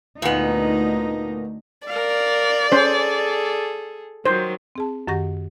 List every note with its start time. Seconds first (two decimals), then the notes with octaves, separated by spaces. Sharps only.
0.22 D2 A#2 B3 D#4
1.88 A#4 D5 F5
2.72 C#4 G#4 A4 C5
4.26 D#3 F#3 C5
4.76 C4 G#4 A5
5.08 F#2 D#3 G4 F#5 C#6 A#6